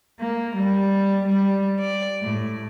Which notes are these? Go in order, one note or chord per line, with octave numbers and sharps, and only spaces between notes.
A#3
G3
G3
D5
A2